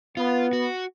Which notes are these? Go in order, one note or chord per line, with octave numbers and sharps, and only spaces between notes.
B3 F4
F#4